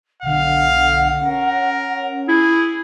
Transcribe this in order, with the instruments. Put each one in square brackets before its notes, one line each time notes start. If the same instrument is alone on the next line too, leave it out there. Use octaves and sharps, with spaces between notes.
[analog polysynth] B1 D3 [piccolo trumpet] F5 [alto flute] F#5
[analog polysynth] C#4 [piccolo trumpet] A#4
[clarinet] E4 [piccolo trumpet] G#4